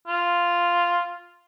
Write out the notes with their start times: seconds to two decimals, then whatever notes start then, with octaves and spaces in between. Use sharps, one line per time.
0.07 F4